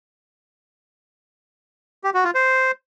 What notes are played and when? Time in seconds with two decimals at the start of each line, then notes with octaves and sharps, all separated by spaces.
2.04 G4
2.14 F#4
2.24 F4
2.35 C5